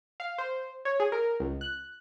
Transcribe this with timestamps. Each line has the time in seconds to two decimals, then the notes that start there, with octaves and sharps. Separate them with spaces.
0.20 F5
0.38 C5
0.85 C#5
1.00 G#4
1.12 A#4
1.40 C#2
1.61 F#6